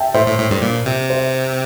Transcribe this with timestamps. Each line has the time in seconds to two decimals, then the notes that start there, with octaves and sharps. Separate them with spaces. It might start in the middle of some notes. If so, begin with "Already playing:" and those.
Already playing: E5 G5 A5
0.14 A2 C5 E5
0.26 A2
0.38 A2
0.50 G2
0.62 A#2
0.86 C3
1.10 C5 E5